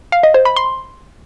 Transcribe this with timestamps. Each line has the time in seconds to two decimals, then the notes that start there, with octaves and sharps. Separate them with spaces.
0.12 F5
0.23 D#5
0.34 C5
0.45 B5
0.56 C6